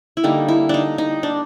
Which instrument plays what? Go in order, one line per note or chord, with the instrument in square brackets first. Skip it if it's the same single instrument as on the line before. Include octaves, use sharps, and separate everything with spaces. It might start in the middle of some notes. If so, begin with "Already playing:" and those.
[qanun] E4
D3 G3 A#3 D#4
E4
D4 D#4
D#4
D4